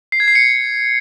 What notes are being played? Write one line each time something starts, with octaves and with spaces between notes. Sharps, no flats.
C7
G#6
C7
C#7